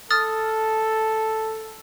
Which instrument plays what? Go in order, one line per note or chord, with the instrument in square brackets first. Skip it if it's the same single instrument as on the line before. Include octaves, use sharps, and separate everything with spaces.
[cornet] A4 [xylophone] D#6 F6 A6